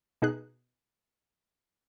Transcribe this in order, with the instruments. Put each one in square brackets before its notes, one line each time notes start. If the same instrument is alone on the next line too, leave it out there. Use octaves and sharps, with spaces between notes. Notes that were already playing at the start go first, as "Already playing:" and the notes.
[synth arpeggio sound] B2 D#4 G#4 F#6